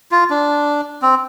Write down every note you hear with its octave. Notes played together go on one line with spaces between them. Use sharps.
F4
D4
C4